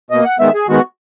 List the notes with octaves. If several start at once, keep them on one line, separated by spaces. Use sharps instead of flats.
B2 A#3 D#5
F#5
D#3 G#3 B3 E5
G#4
D#3 G#3 B3 F#4